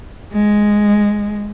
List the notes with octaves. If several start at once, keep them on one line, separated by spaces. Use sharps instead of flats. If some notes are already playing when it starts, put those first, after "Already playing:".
G#3